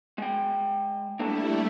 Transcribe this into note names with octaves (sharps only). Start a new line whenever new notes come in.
G#3 G5
G3 A3 A#3 D4 E4 A4